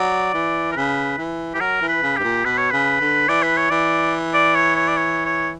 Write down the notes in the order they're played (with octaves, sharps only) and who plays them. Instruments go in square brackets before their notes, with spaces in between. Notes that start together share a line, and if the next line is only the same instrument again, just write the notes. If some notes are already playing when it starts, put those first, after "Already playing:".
Already playing: [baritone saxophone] F#3 [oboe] D5
[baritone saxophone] E3
[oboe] A#4
[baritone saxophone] C#3 [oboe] B4
[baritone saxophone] E3
[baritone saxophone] E3 [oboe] G4
[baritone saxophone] F#3 [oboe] A#4
[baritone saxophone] E3
[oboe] B4
[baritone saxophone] C#3
[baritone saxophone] G2 [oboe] G4
[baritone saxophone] A#2
[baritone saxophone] B2 [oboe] B4
[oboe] C#5
[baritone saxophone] C#3 [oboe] B4
[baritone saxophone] D3
[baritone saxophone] E3 [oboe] D5
[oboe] B4
C#5
[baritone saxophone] E3 [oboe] D5
[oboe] D5
C#5
C#5
D5
C#5
C#5